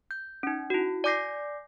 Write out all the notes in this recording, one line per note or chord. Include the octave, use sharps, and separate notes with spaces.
G6
C#4 D#4
E4 F#4
D5 G#5 D6 G6 A#6 C7